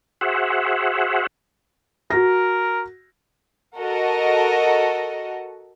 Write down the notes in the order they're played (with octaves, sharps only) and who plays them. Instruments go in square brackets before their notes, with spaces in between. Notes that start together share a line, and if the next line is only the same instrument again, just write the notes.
[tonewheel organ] F#4 G#4 C5 E5 F#5
[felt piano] F#4 A#6 [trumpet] A#4
[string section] F#4 A4 A#4 D#5 F#5